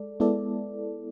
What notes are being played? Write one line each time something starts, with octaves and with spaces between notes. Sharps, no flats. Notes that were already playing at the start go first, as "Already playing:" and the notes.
Already playing: G#3 A4 D5
G#3 B3 E4 A4 D5